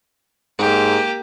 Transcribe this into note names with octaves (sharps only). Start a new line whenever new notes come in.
G#2 A#3 G4